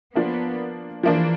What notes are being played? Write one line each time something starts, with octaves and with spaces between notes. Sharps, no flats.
F3 A#3 B3 D4
E3 F3 A#3 D4